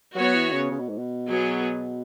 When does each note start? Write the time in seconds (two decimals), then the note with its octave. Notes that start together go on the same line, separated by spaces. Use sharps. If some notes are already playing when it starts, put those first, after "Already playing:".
0.15 F#3 B3 F#4 C#5
0.35 E3
0.52 C#3
0.71 C#3
0.79 B2
0.89 G#2
0.98 B2
1.26 F#3 B3 G#4